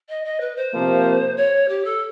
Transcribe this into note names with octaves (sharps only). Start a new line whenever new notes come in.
D#5
D#5
B4
C5
C3 F3 A#3
C#5
G4
A4